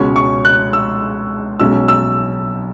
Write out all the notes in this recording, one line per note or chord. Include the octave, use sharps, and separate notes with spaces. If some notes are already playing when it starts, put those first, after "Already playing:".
Already playing: C#2 B2 G#3 C#4 C#5
C#6
F#6
E6
B1 B2 G#3 C#4 E6
E6